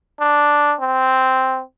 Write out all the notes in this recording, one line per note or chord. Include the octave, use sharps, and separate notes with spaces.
D4
C4